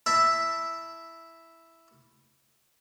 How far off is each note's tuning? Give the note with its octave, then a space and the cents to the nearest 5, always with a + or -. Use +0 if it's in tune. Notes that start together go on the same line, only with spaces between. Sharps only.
E4 +0 E5 +0 A5 +10